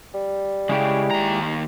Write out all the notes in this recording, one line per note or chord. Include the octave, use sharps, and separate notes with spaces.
G3
C#3 G#3 E4 G4
D#2 A#5